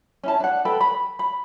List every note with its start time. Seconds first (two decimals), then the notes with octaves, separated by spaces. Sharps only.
0.24 C#4 E4 A5
0.40 D4 F#5
0.65 A4 B4 G5 B5
0.81 B5
1.19 B5